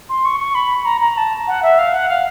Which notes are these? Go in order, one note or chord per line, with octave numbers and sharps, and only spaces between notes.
C6
C#6
C#6
B5
A#5
A#5
A5
F#5
E5
F5
F#5
F5